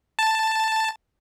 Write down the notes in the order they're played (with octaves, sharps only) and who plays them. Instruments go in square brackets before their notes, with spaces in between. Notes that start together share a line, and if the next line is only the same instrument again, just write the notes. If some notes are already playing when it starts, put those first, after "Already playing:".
[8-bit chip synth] A5